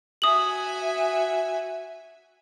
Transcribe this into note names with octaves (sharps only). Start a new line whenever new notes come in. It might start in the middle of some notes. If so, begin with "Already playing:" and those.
F#4 E5 G#5 D#6 F#7